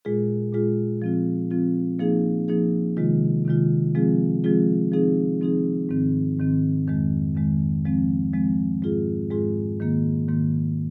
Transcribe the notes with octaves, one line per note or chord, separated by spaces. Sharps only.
A#2 G#3 F4 G#4
A#2 G#3 F4 G#4
F3 C4 F4
F3 C4 F4
F3 A#3 D#4 G#4
F3 A#3 D#4 G#4
C3 D#3 G#3 F4
C3 D#3 G#3 F4
F3 G#3 C4 F4 G#4
F3 G#3 C4 F4 G#4
F3 C4 D#4 G#4
F3 C4 D#4 G#4
G#2 D#3 C4
G#2 D#3 C4
F2 D#3 G#3
F2 D#3 G#3
F3 G#3 C4
F3 G#3 C4
G#2 G#3 F4 G#4
G#2 G#3 F4 G#4
G#2 D#3 A#3
G#2 D#3 A#3